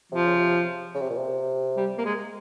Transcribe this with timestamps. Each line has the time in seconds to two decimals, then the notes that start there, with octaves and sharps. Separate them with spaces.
0.12 C3 F3
0.25 C#3
0.40 C3
0.94 C#3
1.02 C3
1.10 A#2
1.17 C3
1.77 G3
1.98 A#3
2.05 G#3